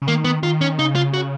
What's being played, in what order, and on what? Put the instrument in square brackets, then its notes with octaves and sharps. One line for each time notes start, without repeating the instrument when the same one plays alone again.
[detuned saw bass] C#3
[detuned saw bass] D#3 [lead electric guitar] A#3
[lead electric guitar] B3
[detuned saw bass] D#3 [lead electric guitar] F4
[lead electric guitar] C#4
[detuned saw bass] C#3 [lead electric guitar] D#4
[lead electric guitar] F4
F#4